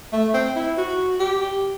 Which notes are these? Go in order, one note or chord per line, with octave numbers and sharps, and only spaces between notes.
A3
C4
E4
F#4
G4